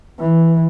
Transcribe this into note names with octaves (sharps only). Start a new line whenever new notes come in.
E3